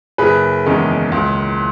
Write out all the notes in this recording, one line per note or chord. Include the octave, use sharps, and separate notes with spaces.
F#1 G#4 B4
E2 D#3 G#3 C#4
C#2